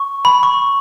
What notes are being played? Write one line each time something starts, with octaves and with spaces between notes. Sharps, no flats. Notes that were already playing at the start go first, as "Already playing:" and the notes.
Already playing: C#6
B5
C#6